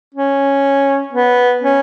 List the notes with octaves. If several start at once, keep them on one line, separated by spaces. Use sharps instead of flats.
C#4
B3
C#4